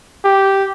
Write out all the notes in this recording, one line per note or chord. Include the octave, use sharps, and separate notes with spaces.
G4